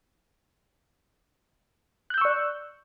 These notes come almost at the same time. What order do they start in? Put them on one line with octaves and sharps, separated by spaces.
F#6 G6 E6 C#6 D5